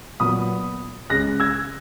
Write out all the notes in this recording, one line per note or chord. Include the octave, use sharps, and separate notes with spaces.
A#2 F#3 B3 B5 D#6
C#2 C#3 G#3 C#4 F#6 A#6
E6 G#6